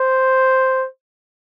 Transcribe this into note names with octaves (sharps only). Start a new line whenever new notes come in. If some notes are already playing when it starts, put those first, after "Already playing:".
Already playing: C5